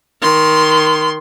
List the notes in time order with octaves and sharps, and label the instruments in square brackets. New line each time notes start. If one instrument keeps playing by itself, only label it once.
[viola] D#3 C6